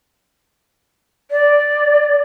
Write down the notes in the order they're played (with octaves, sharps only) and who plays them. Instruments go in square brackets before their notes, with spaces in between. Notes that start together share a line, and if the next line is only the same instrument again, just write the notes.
[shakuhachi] D5